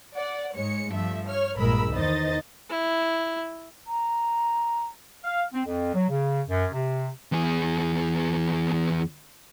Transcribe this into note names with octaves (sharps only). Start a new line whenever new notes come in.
D5 F#5
G#2 G#3 C#5 C#7
G2 F3 A3 E5
C#5 F6
A#1 G2 G#3 A#4 B5 E6
E2 D#3 D#4 C5 D#5 A6
E4
A#5
F5
C4
F2
F#3
C#3
F#2
C3
E2 G#4